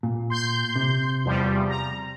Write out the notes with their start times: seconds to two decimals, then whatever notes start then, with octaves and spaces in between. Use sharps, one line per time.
0.03 A#2
0.30 C6 G6
0.76 C3
1.25 E2 F3 G3
1.69 A#5